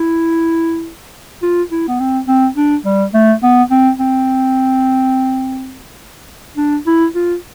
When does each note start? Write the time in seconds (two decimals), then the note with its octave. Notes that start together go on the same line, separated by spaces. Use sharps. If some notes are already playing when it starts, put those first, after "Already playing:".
Already playing: E4
1.42 F4
1.71 E4
1.88 B3
2.00 C4
2.28 C4
2.56 D4
2.85 G3
3.14 A3
3.43 B3
3.71 C4
3.99 C4
6.57 D4
6.87 E4
7.15 F4